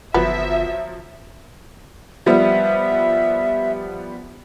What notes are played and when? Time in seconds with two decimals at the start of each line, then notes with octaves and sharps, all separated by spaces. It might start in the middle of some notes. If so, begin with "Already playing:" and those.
0.14 G1 F3 F#3 B3 E5
2.26 F3 G3 B3 E5